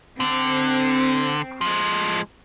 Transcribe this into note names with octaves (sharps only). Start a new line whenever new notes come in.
D3 C4
F3 G#3